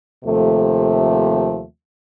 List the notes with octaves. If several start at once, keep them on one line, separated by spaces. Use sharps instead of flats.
D#2 C3 F3 A3